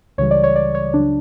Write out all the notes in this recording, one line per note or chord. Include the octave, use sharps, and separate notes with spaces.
C#2 C#3 E3 G3 C#5
D5
C#5
D5
C#5
C#2 C#3 F#3 D4